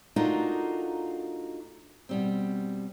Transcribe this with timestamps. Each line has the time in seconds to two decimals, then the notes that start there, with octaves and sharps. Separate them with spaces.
0.16 A3 D4 D#4 F4 F#4 A#4
2.09 B2 G3 C4